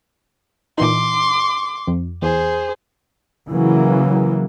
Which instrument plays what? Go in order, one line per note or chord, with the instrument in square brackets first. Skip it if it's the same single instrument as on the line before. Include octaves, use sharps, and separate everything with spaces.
[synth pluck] A#2 E3 D#4 [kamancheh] C6 D6
[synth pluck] F2
[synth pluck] E2 [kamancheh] G#4 C5
[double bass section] C#3 E3 F#3 A#3